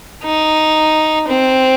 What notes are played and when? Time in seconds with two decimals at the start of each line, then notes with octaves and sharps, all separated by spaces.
0.24 D#4
1.28 C4